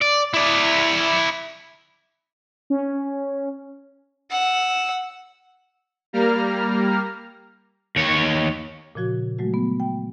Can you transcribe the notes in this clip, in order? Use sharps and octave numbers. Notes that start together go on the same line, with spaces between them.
D5
E4 D5
C#4
F#5 E6
G3 A#3 A#5 F6
D#2 C#5
A#2 C#3 F3 F#4
F#3 G#3 A3 F#4
B3
G5